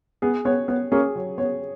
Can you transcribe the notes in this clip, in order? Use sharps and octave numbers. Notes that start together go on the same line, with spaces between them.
B3 G#4
B3 C#5
B3 C#5
A#3 C#4 G#4
F#3
B3 C#5